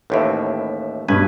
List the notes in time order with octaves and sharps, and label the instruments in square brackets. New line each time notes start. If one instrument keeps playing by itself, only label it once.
[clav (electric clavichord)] A1 D#2 A2 [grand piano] B4 C5 E5
[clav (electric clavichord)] B1 B4 G#5 [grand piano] G2 B2